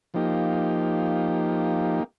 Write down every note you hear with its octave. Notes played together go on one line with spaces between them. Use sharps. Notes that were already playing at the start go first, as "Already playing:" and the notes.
F3 A#3 D#4 G4